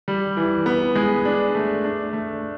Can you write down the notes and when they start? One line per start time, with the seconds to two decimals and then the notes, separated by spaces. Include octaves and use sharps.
0.08 G3
0.37 E3
0.66 B3
0.96 G#3
1.25 D4
1.55 A3
1.84 D4
2.13 A3